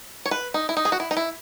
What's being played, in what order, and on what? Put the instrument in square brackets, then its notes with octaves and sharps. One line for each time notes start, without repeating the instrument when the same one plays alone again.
[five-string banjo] C#5
B4
D#4
E4
D#4
G#4
F#4
E4
D#4
E4